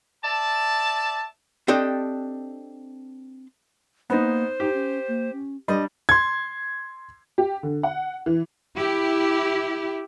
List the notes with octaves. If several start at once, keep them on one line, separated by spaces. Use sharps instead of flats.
D5 E5 A5
C4 D4 G4 A4 D#5
A#3 B3 D#4 C5
D#4 G4
C#4
A#3
C#4
G3 D4 D#5
C6 G#6
G4
D3
F#5
E3
E4 G4